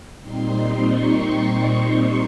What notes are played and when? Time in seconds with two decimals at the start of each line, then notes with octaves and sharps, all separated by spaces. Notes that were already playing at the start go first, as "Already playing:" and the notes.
0.21 A#2 G3 C4 D#4 C6
0.80 C#6
1.95 C#6